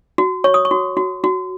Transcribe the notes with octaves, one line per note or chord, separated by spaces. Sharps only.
F#4
C#5 C#6
D#6
C#6
F#4
F#4
F#4